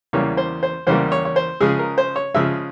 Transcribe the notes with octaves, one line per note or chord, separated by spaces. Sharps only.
E2 C#3 E3 G3 A#3 C#5
C5
C5
E2 C#3 E3 G3 A#3 C5
C#5
C#5
C5
C#3 F3 G#3 G#4
A#4
C5
C#5
C#3 F3 G#3 E5